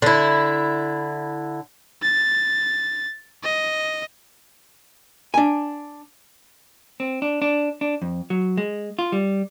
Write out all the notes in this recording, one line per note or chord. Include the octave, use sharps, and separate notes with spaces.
D3 E4
A6
D#5
D4 G#5
C4
D4
D4
D4
F2
F#3
G#3
F4
G3